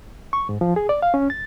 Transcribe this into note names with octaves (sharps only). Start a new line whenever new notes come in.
C#6
G#2
F3
G#4
D5
F5
C#4
A6